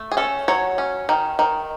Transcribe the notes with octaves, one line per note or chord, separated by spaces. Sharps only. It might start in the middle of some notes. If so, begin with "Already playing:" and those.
Already playing: A3
G#4
C#4 A4
F#3 C#5
C#4
D#3
D#3